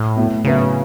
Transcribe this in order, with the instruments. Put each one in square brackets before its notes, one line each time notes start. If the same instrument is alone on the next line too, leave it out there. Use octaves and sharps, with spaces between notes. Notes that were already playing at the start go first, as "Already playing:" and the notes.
Already playing: [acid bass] A2
[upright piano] B2 A3 E4
[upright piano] A2 F#3 B3 E4 [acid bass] C#3